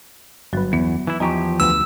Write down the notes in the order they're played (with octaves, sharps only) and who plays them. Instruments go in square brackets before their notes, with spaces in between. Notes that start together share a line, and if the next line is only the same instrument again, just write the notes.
[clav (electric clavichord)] G1 B4 [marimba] F#3 F#4
[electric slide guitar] E2 [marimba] B3
[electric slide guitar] E3 E4
[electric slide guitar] E2 F3 G4 [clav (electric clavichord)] D#4 [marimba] G#5 A#5 C#6
[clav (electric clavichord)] D2 B3 F5 [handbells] E6